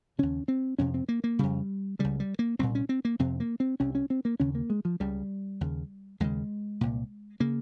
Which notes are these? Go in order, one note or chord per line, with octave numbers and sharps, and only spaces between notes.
D#2 C#3 C#4
C4
F2 C3 C#4
C4
A#3
A#3
F2 C#3 G3
C#2 C#3 G3
G3
A#3
C2 A#2 C4
C#4
C4
A#3
F2 C3 C4
A#3
C4
C2 C3 C#4
C#4
C4
A#3
D#2 C#3 C#4
A#3
G#3
F3
C#2 C#3 G3
D#2 C#3
D#2 C#3 G#3
C2 A#2
C#3 A#3